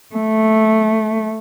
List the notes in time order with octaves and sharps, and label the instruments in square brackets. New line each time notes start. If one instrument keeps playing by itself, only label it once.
[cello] A3